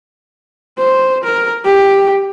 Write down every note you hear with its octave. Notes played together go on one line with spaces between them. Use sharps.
C5
A#4
G4